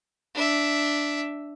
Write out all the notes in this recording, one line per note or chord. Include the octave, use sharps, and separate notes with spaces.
D4 E5